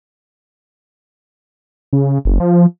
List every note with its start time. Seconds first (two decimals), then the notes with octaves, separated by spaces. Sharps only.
1.93 C#3
2.25 F#1
2.40 F3